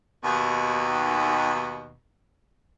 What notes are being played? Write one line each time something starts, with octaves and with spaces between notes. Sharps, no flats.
D#2 B2